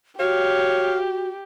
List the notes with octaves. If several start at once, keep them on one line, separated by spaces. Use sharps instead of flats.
F#4 G4 C#5 F5